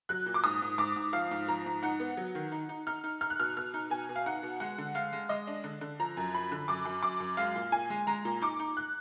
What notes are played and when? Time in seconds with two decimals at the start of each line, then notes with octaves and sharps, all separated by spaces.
0.09 F#3 F#6
0.26 A#2
0.34 D6
0.44 G#2 D#6
0.62 G#2
0.78 G#2 D6
0.96 G#2
1.13 F3 F5
1.31 G#2
1.48 F3 A#5
1.66 G#2
1.83 D#4 F#5
2.00 B3
2.17 F#3
2.35 D#3
2.52 D#4
2.69 D#4
2.87 D#4 F6
3.04 D#4
3.21 D#4 F6
3.30 F#6
3.39 B2 F6
3.57 B2 F6
3.74 D#4
3.90 B2 G#5
4.09 B2
4.16 F5
4.26 D#4 F#5
4.43 B2
4.60 G#3 F#5
4.78 D3
4.94 G#3 F5
5.13 G#3
5.29 G#3 D#5
5.47 D4
5.64 D3
5.81 D3
6.00 F3 A#5
6.17 F#2
6.34 F3 B5
6.52 D3
6.68 F#2 D6
6.85 F#2
7.03 F#2 D6
7.20 F#2
7.37 G#3 F5
7.56 A#2
7.72 A#2 G#5
7.90 G#3
8.07 G#3 A#5
8.25 A#2
8.42 D#4 D6
8.60 D#4
8.77 F#6